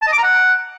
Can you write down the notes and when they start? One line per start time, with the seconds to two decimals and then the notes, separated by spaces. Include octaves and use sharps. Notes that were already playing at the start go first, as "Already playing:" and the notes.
0.02 A5
0.07 D#5
0.13 D6
0.18 A#5
0.23 F#5